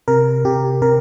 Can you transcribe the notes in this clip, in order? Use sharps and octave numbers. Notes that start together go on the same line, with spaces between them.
C3 A#4
C3 G4
C3 A#4